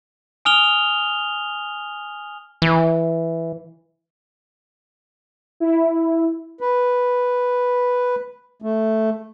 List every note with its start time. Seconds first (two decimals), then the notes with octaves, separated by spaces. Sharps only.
0.45 G#5 D#6 F6 F7 G7
2.62 E3
5.60 E4
6.61 B4
8.62 A3